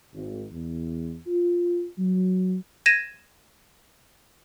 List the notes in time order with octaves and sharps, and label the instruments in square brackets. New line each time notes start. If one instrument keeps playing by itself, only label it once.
[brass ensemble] G#1
E2
F4
F#3
[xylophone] G#6 A#6 D#7 E7